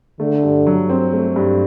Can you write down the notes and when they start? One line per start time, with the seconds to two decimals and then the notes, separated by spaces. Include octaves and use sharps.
0.20 D3 A3
0.43 G2
0.67 F#3
0.89 C4
1.13 A3
1.36 G2